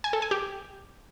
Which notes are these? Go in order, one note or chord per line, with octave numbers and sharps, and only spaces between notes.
G#5
A4
G#5
G4